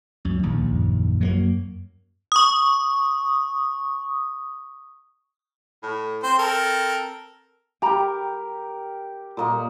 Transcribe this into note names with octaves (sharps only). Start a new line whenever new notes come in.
C#2 F#2
A#1 D#2
F#2
F#3 G3 A#3
C#6 D#6
A2
C4 C5
A4 A#4
G4 A#4 G5 A#5 B5
A#2 A#3 D#5